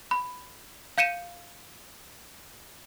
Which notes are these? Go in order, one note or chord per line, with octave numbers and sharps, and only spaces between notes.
B5
F5 G6 C#7 D#7 E7